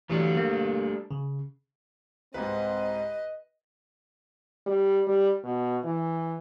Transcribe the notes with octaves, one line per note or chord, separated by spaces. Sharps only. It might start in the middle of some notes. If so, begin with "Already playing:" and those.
E3 F#3 G3 A3 D4
A#3
C#3
C2 G#2 C4 B4 D#5
G3
G3
B2
E3